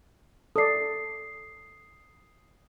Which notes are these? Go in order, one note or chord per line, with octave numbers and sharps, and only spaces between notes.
A4 D5 D#6 C7